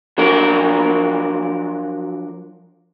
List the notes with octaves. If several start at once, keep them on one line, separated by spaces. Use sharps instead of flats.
F3 F#3 D4 F4 F#4 A#4